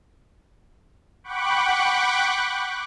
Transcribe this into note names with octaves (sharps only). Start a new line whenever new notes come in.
F#5 G5 B5 C#6 D6 F#6